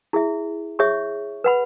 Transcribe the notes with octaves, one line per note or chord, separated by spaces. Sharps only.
E4 G#4 E5
G#4 C#5 E5 C#6
B4 F#5 B5